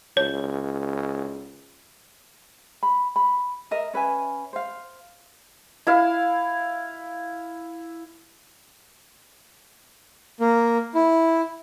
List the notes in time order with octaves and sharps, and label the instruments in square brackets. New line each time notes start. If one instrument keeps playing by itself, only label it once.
[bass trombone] C#2 [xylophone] C#5
[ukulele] B5
B5
A#4 D#5 E5
C#4 B4 E5 G#5
C5 F5
[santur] E4 F5
[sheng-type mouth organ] A#3
E4